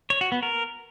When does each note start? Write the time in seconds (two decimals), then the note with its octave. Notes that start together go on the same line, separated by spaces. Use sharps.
0.10 C#5
0.21 F#4
0.32 B3
0.43 A#4